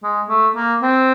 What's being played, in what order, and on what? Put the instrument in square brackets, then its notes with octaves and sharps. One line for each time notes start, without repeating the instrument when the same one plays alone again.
[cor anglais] G#3
A3
A#3
C4